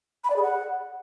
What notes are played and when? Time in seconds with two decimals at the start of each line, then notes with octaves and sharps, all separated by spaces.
0.24 B5
0.30 D5
0.36 G#4
0.42 F#5